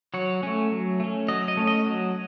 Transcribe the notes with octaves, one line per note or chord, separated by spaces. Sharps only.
F#3 C#5
A3 C#4
F#3
A3 C#4
F#3 D#5
D#5
A3 C#4
D#5
F#3